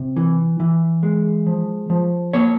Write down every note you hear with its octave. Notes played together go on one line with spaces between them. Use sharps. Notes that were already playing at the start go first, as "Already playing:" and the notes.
Already playing: C3
E3
E3
G#3
F3
F3
A#3 C#5